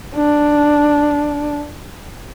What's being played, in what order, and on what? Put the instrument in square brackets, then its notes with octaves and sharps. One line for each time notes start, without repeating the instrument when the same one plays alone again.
[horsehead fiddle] D4